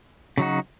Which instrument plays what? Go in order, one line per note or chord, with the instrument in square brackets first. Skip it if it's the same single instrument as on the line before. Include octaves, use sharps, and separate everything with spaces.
[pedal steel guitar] C#3 F#3 D#4 F#4